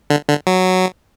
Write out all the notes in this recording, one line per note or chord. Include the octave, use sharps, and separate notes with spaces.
D3
D3
F#3